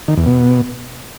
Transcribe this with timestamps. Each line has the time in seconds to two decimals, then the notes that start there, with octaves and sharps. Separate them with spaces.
0.08 D#3
0.17 E2
0.26 B2